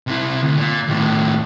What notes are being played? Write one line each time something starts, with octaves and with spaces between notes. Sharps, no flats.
C3 E4
D2
A#2
D#2 A2